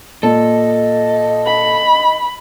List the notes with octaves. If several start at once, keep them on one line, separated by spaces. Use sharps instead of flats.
A#2 A4 D#5
B5